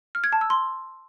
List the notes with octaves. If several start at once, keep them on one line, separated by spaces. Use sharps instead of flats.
F6
G#6
A5
E6
C6